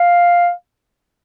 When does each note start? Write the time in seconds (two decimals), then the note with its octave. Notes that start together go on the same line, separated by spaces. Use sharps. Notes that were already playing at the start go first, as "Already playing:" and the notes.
Already playing: F5